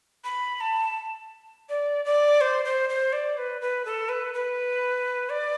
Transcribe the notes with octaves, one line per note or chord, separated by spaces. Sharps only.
B5
A5
D5
D5
C5
C5
C5
D5
B4
B4
A4
B4
B4
D5